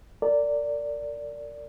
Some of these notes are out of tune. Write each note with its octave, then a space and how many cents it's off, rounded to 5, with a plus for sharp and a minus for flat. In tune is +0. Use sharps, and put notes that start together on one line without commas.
A#4 -30 D5 -10